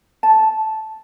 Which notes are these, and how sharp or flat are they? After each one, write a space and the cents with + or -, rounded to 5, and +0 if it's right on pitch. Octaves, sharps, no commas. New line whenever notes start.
A5 -10